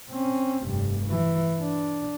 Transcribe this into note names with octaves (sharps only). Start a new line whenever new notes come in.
C4 C#4
F1 G2
E3
D4